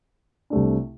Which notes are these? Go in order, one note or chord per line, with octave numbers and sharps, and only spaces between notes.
C2 C3 A3 D4